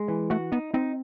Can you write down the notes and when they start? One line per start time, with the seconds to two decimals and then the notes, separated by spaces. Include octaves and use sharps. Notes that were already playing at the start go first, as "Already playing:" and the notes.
Already playing: G#3
0.08 E3
0.30 A3 F#4
0.52 B3 D#4
0.74 C4 D#4